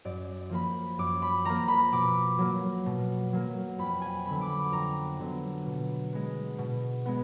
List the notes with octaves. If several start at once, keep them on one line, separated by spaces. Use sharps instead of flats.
F#2 D5
F3 A#3 B5
F#2 D6
B5
F3 A#3 A#5
B5
B2 D6
F#3 A#3
B2
F#3 A#3
F2 B5
G#5
D3 F#3 B3 B5
D6
B5
F2 A#5
D3 F#3 B3
B2
G#3 B3
B2
G#3 B3